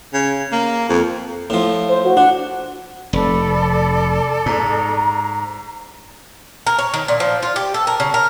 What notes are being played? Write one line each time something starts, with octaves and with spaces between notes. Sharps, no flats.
C#3
A#3
F2
A2 F3
C5
F#4
D4 F#5
F1 A4 D5 B5
G#2 A#5
A#4
C#5
D#3
A#2
F3
F4
G4
A4
A#4
C#3
A#4